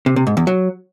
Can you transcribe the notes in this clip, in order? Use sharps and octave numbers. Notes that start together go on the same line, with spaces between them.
C3
C3
G#2
E2
F#3